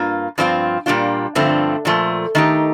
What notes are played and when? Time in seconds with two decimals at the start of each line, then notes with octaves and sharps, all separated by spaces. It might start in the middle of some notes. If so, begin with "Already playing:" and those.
Already playing: G2 A#3 F4
0.38 G2 F3 C4 F4
0.86 A#2 G3 A#3 D4 F4
1.35 G2 D3 F3 A3 C4
1.85 A#2 F3 A3
2.35 D#3 A3 D#4 G4